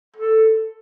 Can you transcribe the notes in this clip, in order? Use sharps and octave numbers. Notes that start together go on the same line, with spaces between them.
A4